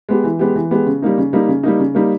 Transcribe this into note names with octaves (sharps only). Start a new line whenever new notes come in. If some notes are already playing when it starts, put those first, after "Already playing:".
G#3 B3 G4
E3
G#3 B3 G4
E3
G#3 B3 G4
C#3
G3 A#3 D#4
C#3
G3 A#3 D#4
C#3
G3 A#3 D#4
C#3
G3 A#3 D#4